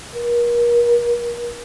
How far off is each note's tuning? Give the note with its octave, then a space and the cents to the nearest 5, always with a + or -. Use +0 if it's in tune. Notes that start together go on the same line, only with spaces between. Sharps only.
A#4 +40